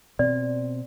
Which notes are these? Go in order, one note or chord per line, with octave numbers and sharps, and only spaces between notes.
B2 C4 D5